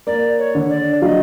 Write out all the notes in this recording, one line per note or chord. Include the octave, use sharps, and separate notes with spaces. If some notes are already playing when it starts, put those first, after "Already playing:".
A#3 D5
C#5
D3
D5
F#3 D#5 F5